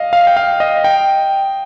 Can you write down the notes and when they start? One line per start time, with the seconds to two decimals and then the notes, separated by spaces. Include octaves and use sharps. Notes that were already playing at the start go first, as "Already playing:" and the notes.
Already playing: D#5 F5
0.13 F5
0.27 G5
0.37 F5
0.60 D#5
0.84 G5